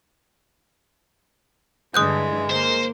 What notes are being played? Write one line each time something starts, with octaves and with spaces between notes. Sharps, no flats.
G2 D3 E3 G#3 D#6 F#6 G6
A#3 A#4 C5